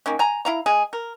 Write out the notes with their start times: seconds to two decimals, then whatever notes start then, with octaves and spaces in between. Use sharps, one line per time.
0.06 D#3 A#3 C#4
0.19 G#5 A#5
0.45 E4 F5 A#5
0.66 G#3 G#4
0.93 A#4